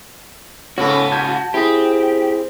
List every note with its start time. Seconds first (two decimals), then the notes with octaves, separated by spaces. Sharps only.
0.78 G#2 C#3 B3 F#4 A4 C#5
1.12 A5 G6 G#6
1.54 C4 E4 G4 G#4